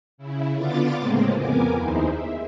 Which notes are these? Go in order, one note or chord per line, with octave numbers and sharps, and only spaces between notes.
C#3 E4
D3 B3 F4 D6 A6
A2 C#3 G#3 A#3 C4
F2 B3 A#4 G#5 D6
D#2 D#4 E4 G#4 C5
E5